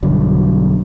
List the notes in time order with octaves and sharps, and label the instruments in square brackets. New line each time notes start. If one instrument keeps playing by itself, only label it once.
[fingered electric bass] B1 G2 D3 F#3